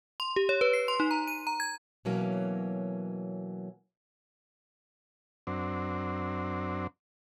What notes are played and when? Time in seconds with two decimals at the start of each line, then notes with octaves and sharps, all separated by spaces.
0.20 C6
0.36 G4
0.49 C#5
0.61 B4
0.73 C7
0.88 C6
1.00 D#4
1.11 A#5
1.28 D#7
1.47 A#5
1.60 G#6
2.05 B2 E3 F#3 A#3 C#4
5.47 F#2 C4 D4